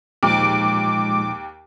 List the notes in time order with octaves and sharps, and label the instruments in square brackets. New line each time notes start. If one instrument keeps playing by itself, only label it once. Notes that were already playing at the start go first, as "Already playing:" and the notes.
[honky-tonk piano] D#2 [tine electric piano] A#2 F3 D#4 [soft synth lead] G#3 [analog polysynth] D6